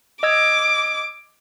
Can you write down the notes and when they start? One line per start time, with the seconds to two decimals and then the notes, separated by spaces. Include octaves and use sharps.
0.23 D#5 D6 E6 G#6